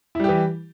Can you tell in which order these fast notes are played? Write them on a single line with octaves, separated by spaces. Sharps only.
E4 G3 G4 E3